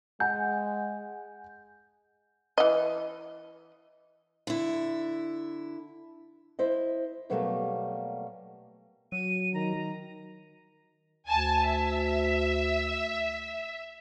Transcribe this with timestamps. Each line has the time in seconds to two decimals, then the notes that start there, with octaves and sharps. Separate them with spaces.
0.20 G#3 F#5 G#5 G6
2.58 E3 D#5
4.47 D3 E4
6.59 E4 C5 D#5
7.30 B2 F#3 G3 A3 A#3
9.12 F#3 D#7
9.54 D#3 A#5
11.27 D2 G#5 A5
11.66 E5